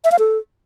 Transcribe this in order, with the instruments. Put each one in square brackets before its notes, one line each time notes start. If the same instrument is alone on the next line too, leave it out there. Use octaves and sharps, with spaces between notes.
[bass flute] E5
F5
A4